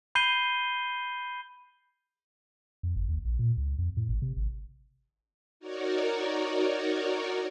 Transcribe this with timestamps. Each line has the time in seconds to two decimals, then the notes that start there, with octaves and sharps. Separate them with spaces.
0.15 B5 G6 C7 D#7 G7
2.83 F2
2.96 G1
3.08 D#2
3.25 A#1
3.39 A#2
3.57 C#2
3.79 F2
3.97 A2
4.09 G#1
4.22 C3
4.37 G#1
5.60 D#4 F#4 A#4 C#5 D5